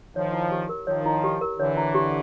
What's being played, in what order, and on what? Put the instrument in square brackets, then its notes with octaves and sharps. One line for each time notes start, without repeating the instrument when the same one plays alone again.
[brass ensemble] D#3 F3 [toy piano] C#5
[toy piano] E4
G4
A#4
[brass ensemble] D#3 F3 [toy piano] C#5
[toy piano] E4
G4
A#4
[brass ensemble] D3 E3 [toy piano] C#5
[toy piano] E4
G4